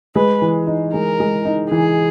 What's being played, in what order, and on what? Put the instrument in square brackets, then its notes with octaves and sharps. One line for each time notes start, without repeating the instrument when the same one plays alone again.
[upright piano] G#3 [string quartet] B4
[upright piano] E3
D#4
[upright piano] G#3 [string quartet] A#4
[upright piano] G#3
D#4
[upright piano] E3 [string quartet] G#4